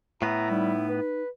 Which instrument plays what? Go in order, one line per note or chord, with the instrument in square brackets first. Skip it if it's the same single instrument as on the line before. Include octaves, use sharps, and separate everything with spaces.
[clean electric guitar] A2 B3 [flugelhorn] E4 [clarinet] A#5
[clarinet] G3 [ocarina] D#4
[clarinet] B4